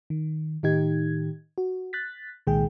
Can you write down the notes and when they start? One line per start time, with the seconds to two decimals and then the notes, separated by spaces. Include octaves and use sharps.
0.10 D#3
0.63 A2 D#3 D#4 G4 G#6
1.58 F#4
1.93 F#6 A6 B6
2.47 C2 A#2 D#3 G#3 G#4 G5